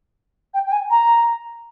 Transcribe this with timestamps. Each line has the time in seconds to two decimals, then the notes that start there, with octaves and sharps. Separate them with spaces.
0.54 G5
0.66 G5
0.72 G#5
0.90 A#5